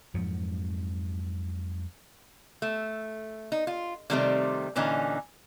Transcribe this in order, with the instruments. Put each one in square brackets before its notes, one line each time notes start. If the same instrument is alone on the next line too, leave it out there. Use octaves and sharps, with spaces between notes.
[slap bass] F2 G#2 F3 F#3
[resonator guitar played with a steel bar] A3
D#4
F4
C3 D#3 G3 A3 B3 C4
A#2 D3 E3 C#4 D#4